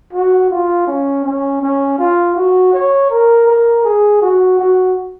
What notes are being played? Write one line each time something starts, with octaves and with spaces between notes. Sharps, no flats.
F#4
F4
C#4
C#4
C#4
F4
F#4
C#5
A#4
A#4
G#4
F#4
F#4